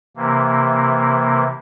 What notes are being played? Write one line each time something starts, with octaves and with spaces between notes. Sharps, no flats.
C3 E3 A#3